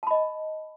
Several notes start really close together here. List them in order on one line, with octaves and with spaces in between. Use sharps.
A5 B5 D#5